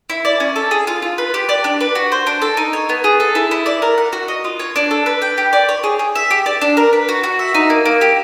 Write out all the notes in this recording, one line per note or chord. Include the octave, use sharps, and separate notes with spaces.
E4
D5
C#4
A4
G#4
F4
F4
B4
G4
D5
D4
B4
F#4
C5
D4
A4
D#4
C#5
B3
G#4
A4
E4
E4
D5
A#4
F#5
F#4
D#5
F4
C#5
D4
A4
B4
G5
G4
D5
C#5
G#4
G#4
E5
G4
D5
D4
A#4
B4
F#4
F#4
E5
D#4
A#3
A#3
G4